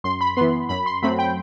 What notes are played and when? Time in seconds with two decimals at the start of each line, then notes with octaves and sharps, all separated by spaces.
0.04 F#2 C6
0.21 B5
0.36 E3 B3 C6
0.69 F#2 B5
0.86 C6
1.02 F#3 A3 C4 B5
1.19 G5